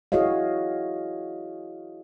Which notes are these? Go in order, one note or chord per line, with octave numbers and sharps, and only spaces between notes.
E4 F#4 G#4 C#5 D#5 F5